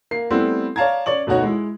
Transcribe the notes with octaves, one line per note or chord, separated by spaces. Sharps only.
A#3 C7
G3 A3 B3 C4 E4
C#5 D5 F5 A5 A#5 G#6
C#4 C#5 D5 C#6 F#7
D2 B2 D#4 F#4 C#5
G#3 E4